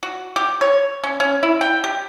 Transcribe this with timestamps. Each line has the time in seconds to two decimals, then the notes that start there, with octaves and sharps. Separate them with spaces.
0.03 F#4
0.36 G4
0.61 C#5
1.04 C#4
1.20 C#4
1.43 E4
1.61 G5
1.84 G4